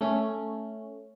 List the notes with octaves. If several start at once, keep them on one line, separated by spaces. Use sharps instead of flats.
A3 C#4